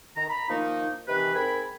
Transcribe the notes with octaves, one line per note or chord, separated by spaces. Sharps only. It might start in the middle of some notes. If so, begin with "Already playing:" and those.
D#3 A#5
A#5 B5
D#3 F3 A#3 D#4
C3 D#3 E3 B4
G#2 C4 A#4 G#5 B5